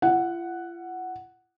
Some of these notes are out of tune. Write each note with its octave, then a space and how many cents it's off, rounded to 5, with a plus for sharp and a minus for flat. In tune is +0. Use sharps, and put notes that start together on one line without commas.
F4 -45 F#5 +0